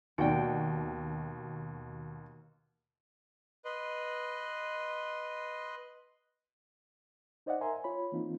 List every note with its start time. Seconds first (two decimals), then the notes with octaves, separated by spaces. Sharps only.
0.18 D#2 B2 D#4 F#4 D5 G5
3.65 B4 D#5 C6
7.46 D#4 C5 D5 D#5 F5 F#5
7.61 A#4 E5 G#5 A#5 C6
7.84 F4 C#5 B5
8.12 E3 A#3 C4 D#4 F4